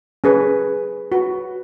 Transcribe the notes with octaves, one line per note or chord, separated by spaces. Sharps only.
C#4 G#4 B4
F#4 B4